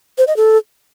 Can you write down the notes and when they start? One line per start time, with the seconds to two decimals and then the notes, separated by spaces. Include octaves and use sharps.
0.18 C5
0.27 D#5
0.37 A4